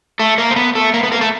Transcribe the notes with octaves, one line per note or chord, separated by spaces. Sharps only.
A3 A4
A#3 A#4
C5
B3 B4
A3 A4
A#3 A#4
B3 B4
A#3 A#4
A3 A4